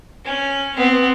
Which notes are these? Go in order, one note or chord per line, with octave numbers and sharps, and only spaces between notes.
C#4
B3 C4